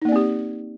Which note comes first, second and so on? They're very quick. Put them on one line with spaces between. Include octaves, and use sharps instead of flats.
D#4 A#3 D5 C4 G4